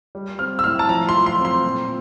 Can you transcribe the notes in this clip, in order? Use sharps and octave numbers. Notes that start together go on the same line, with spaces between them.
G3
C4 F6
E6
A2 F6
A5
F3 A#5
C6
F3
C6
C4
C6
A#2